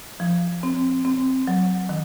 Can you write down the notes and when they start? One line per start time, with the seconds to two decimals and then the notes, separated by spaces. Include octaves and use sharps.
0.20 F3
0.63 C4
1.05 C4
1.47 F#3
1.89 D#3